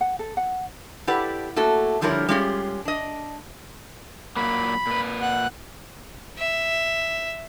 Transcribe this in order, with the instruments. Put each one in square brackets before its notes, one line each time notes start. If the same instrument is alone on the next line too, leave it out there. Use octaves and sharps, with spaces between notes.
[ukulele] F#5
A4
F#5
[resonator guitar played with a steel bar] E4 G4 A4 B4 D5 F#5
A3 A#3 F#4 A4
D3 F3 G3 E4 A#4 C#5
G3 G#3 C#4 F4 G4 G#4
D4 D#5
[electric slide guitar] A#2 F#3 A#3 [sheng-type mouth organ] B5
[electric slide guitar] A#2 B4
[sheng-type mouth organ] F#5 F#6
[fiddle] E5